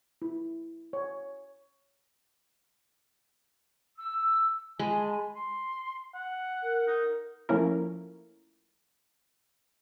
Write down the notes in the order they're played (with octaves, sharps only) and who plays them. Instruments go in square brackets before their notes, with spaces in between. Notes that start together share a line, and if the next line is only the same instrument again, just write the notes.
[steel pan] E4
C#5
[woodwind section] E6
[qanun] G#3 [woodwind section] G#5 A5 B5
[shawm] C6
F#5
[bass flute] A#4
[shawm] D#4
[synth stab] F3 A3 A#3 C#4 E4 A#4